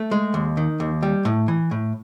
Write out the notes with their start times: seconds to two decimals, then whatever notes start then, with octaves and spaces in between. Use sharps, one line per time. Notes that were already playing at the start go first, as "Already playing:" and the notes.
Already playing: A3
0.11 G#3
0.34 D#2
0.57 D#3
0.80 D#2
1.03 G3
1.25 A2
1.48 E3
1.71 A2